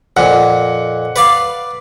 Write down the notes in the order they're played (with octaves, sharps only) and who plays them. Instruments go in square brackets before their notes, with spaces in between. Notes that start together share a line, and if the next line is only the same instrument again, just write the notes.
[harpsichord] F2 A#2 [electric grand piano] F#5
[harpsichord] B4 D5 F5